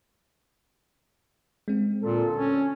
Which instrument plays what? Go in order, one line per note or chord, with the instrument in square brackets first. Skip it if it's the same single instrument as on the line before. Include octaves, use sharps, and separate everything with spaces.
[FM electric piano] G#3 C4
[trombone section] D2 A4 [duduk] A#2
[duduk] C#4